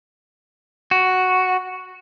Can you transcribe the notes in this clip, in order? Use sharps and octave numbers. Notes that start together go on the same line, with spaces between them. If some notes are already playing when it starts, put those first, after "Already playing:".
F#4